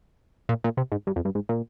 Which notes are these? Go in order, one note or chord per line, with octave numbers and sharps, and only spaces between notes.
A#2
A#2
C3
G#2
G2
F2
G2
G#2
A#2